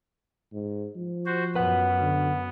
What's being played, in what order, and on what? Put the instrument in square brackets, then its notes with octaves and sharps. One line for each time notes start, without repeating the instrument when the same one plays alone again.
[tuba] G#2
F3
[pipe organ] F#4 C5
[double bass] F#2 [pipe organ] B3 [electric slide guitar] B4 F#5
[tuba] D3